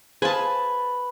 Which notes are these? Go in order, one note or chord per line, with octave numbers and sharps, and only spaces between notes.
G#4 B4 C5 F5 G#5 A5